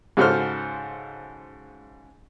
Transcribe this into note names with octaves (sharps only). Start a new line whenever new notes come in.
G#2 C#3 F#4 A4 C5 F6